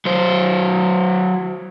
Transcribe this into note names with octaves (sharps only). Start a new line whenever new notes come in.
F#3 C5